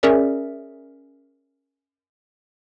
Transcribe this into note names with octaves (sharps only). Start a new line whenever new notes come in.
C#4 G#4 A#4 D5 E5